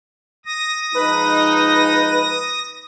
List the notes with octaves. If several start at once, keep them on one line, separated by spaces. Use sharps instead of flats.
D#6 A#6
F3 G#3 D#4 B4